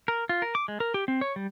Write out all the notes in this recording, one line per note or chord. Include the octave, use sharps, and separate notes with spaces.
A#4
F4
A#4
D6
G#3
A#4
G4
C4
C#5
G3